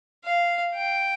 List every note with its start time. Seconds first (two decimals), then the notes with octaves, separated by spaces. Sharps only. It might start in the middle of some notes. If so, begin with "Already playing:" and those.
0.24 F5
0.75 G5